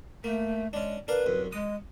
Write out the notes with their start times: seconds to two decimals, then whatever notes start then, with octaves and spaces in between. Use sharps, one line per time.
0.24 A3 A#3
0.73 G#3 C#4 D4
1.08 D4 A#4 B4 F5
1.26 C2 F#2
1.53 G#3 D#6